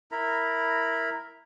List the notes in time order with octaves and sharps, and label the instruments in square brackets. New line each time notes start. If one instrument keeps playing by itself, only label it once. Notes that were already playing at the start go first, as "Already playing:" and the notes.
[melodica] E4 A#4 A#5 B5